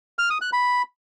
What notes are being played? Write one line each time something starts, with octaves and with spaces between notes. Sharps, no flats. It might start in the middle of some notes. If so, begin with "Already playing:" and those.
F6
D#6
F#6
B5